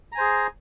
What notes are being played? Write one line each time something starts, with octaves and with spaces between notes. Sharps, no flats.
G#4 C5 G#5 A#5